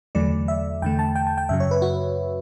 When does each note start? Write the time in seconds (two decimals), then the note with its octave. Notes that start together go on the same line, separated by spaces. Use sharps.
0.15 E2 D3 F#3 A3 D5
0.48 E5
0.82 E2 D3 A3 G5
0.99 A5
1.15 G5
1.27 A5
1.38 G5
1.49 F#2 C#3 F#3 E5
1.60 C#5
1.71 B4
1.82 F#4